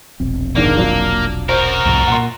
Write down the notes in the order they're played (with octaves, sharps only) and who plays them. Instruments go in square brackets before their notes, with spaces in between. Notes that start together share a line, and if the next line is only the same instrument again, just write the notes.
[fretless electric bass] E1 A#1 C4
[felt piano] G#2 D#3 D4 [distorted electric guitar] A#3
[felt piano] F#3 D4 F4
[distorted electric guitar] F#4 A#4 [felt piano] C5
[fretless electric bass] C2 F2 A2
[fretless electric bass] A#2 [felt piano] F#5 C6